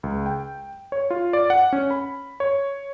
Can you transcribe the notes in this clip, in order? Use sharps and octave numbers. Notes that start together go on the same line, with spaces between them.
C#2
G5
C#5
F4
D5
F#5
C#4
B5
C#5